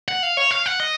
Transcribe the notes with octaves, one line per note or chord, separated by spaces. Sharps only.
F#5
F5
C#5
F5
F#5
D#5